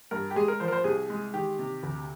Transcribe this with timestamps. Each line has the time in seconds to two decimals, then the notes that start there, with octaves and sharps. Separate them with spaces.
0.11 G2 A#4
0.31 G4
0.36 G#3 G#4
0.48 A#4
0.60 F3 C5
0.68 A#4
0.72 C5
0.84 C2 G#4
1.10 G#3
1.34 D#3 G4
1.59 C3
1.83 D2